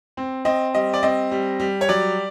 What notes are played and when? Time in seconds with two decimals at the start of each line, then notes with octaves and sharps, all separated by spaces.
0.17 C4
0.45 C4 D#5
0.74 G3 D#5
0.94 D5
1.03 C4 D#5
1.31 G3
1.59 G3
1.81 C#5
1.89 F#3 D5